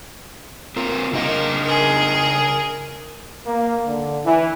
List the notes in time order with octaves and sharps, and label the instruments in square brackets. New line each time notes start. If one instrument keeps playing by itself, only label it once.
[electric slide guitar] C4 F4 A#4
[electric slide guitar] C#3 D4 D#5 [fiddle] A#3
[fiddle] G#4 A#4
[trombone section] A#3
D3
E3